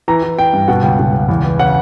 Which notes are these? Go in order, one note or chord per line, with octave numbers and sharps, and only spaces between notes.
E3 A#5
E3
E3 G5
G2
B2 F#5
C#2 G5
B2
C#2
E2
E3
C#3 F#5